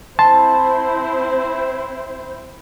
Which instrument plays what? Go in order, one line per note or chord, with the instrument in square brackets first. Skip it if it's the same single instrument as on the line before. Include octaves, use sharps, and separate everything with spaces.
[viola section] C4 E4 C5 [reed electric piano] A5 C6